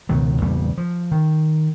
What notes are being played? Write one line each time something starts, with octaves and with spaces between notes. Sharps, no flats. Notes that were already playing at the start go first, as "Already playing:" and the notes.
C#2 B2 D#3 F#3
E2 A#2 C#3 G3
F3
D#3